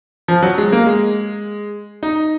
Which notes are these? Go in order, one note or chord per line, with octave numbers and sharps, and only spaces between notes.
F3
F#3
G#3
A#3
G#3
D#4